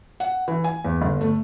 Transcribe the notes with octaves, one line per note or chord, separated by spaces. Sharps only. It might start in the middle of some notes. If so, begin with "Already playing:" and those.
F#5
E3
G#5
E2
G1
A3